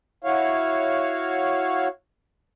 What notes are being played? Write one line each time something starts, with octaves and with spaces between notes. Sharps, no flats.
E4 F#4 C#5 F5